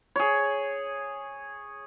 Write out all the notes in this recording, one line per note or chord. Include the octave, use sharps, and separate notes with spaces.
G#4 C#5